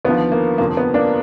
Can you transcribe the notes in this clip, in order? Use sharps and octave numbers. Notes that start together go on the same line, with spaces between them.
D#2 D3 F3 B3
A#3
F1 F2 D3 F3 A#3
B3
A#3 D4